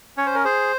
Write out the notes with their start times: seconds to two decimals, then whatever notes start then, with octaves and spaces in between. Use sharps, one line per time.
0.17 C#4 C#5
0.26 C5
0.35 A#4
0.44 G#4 C5